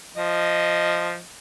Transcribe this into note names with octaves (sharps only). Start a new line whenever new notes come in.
F3 D#5